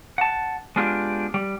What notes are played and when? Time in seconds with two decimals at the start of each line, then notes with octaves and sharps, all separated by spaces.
0.18 F#5 A5
0.76 G#3 B3 D4 F4 G4
1.34 G3